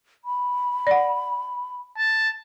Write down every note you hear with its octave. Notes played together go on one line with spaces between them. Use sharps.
B5
D5 F#5
A5